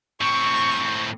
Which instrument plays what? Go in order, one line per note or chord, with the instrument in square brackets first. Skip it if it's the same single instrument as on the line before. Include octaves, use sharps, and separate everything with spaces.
[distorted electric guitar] A2 C4 [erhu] C#6